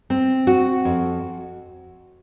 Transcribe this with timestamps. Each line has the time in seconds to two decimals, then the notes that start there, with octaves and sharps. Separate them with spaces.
0.10 C4
0.47 F#4
0.85 F2